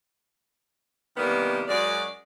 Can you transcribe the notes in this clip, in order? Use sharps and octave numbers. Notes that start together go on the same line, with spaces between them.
C3 D#3 E3 G3 A#3 B3
F#2 G#3 F#4 D5